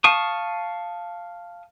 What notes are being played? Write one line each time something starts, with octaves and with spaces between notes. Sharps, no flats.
F5 A5 C#6 D#6